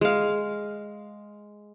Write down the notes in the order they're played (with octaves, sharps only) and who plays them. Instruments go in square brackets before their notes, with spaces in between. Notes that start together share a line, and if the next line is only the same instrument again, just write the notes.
[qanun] G#3 F5